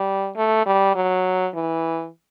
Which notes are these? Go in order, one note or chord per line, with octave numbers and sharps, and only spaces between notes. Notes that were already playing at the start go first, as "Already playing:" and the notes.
Already playing: G3
A3
G3
F#3
E3